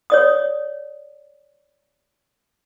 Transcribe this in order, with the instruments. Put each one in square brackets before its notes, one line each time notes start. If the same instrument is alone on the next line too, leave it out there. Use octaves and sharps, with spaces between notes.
[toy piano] C#5 D5 D#6